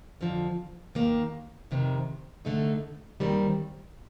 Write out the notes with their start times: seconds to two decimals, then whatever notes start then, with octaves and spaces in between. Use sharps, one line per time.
0.21 F2 D3 F3
0.95 D#2 D#3 A#3
1.71 F2 C3 D#3
2.45 D3 A3 D#4
3.20 D#2 D#3 G3 C4